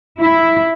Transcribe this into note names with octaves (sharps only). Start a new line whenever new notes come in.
E4